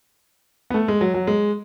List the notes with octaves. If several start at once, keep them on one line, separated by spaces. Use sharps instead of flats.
B3
A3
G#3
F#3
F#3
G#3